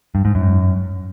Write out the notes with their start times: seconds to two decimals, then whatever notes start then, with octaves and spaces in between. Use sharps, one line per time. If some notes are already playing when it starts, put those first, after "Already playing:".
0.15 G2
0.25 G#2
0.35 F#2